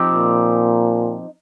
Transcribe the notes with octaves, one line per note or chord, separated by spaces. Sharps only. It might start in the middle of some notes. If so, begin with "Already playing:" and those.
Already playing: F3 C4 D#4 G4
A#2